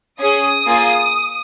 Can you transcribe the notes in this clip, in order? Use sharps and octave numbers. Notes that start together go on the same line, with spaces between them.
C#4 G#4 D#6
A#3 F4 G#4